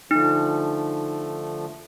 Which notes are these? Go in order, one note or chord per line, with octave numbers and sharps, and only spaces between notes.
D3 F3 A3 D#4